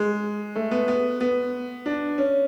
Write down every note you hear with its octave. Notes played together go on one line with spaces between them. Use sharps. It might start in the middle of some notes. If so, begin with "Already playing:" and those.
Already playing: G#3
A3
B3
B3
B3
D4
C#4